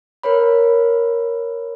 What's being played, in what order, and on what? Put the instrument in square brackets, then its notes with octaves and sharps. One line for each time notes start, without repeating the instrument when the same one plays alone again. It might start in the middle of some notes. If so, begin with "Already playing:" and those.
[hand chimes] A#4 B4 C#5 B5